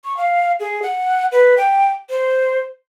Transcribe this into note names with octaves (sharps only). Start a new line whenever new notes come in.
C#6
F5
G#4
F#5
B4
G5
C5